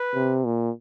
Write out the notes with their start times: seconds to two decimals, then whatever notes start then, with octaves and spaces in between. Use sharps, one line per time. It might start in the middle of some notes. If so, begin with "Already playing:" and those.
Already playing: B4
0.15 C3
0.45 A#2